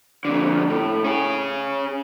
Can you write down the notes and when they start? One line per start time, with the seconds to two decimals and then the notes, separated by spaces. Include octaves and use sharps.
0.25 F2 D3
0.70 A2
1.04 C#4 G#4